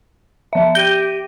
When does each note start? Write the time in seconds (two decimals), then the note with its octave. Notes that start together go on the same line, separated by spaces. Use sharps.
0.53 F3 E5 A5
0.75 G4 G6 A#6 D7 D#7